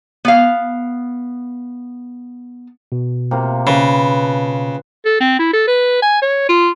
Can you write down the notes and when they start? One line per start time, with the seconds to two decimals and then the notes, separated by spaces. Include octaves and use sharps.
0.25 B3 F5
2.92 B2
3.31 C3 A#3 F4
3.67 C#3 B4
4.23 A5
5.05 A4
5.21 C4
5.39 E4
5.53 A4
5.68 B4
6.02 G#5
6.22 C#5
6.49 F4